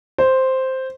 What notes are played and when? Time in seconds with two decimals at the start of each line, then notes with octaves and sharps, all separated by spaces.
0.18 C5